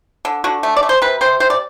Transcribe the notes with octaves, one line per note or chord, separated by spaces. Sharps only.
D3
D3 F#4
A3
D5
A3
C5
C3 B4
C3 C5
C3 C5
D5